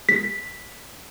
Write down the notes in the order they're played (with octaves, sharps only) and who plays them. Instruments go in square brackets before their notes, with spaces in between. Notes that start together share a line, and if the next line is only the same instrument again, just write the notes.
[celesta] B6